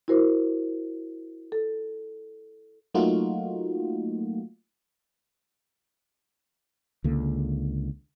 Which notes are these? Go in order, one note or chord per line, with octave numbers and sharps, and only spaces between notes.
E4 F#4 A#4 C5
A4
F#3 A3 A#3 D#4 F4 F#4
C#2 D3 A#3